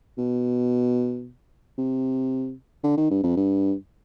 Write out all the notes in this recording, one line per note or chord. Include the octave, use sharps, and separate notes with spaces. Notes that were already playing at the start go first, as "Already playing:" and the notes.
B2
C3
D3
D#3
G2
F2
G2